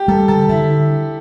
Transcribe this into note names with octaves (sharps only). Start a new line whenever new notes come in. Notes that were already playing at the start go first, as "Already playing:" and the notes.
Already playing: G4
G3 A4
D3 A4
D3 E4